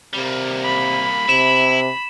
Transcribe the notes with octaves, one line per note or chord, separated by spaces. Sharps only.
C3 G3 A#3
B5
C3 E4 E7